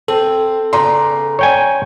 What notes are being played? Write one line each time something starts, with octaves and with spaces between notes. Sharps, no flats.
C4 A4
C#3 B3 D5 A#5 C6
C#5 G5 G#5